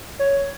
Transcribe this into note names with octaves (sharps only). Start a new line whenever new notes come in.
C#5